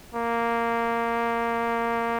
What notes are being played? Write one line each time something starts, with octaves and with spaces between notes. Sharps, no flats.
A#3